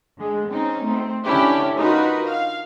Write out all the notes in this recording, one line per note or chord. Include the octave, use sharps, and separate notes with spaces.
D3 G#3
C4 C#4 D#4
A3 C4
D3 C#4 D4 E4 G4
D#4 F4 F#4 A#4 B4
F5